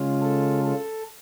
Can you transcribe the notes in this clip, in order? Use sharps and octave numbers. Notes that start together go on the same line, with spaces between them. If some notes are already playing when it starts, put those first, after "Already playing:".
Already playing: C#3 G#3 C#4 F4
A4
A4